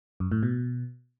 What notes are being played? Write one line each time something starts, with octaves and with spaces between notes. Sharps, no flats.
F#2
A2
B2